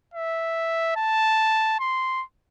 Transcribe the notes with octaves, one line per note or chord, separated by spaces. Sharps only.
E5
A5
C6